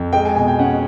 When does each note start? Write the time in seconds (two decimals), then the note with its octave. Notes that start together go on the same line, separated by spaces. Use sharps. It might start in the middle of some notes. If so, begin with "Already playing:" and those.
Already playing: F2
0.13 G#3 G5
0.25 G#5
0.35 B2 G#5
0.48 G5
0.59 C#4 F#5